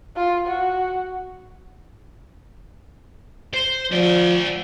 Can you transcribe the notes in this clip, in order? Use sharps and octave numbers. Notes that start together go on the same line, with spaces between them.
F4
F#4
C5
F3 F#4 D5